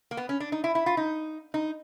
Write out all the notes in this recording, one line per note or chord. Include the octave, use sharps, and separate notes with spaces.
A#3
B3
C#4
D4
D#4
E4
E4
F4
D#4
D#4